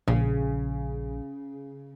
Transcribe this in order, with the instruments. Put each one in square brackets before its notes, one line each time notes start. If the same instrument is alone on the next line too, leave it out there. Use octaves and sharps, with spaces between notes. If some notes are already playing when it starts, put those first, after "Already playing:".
[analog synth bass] A#1 [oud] C#3